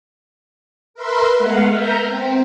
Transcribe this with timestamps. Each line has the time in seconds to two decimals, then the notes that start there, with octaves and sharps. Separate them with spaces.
0.94 A#4 B4 E5 C6
1.37 G#3 A3 B3 F5 F#5
1.72 B3 A#4 E5 A#5 G6
2.04 C4